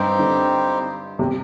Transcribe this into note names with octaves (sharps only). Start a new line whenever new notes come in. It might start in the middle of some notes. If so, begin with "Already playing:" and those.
Already playing: G2 C4 D#4 G4 C5
D3
C3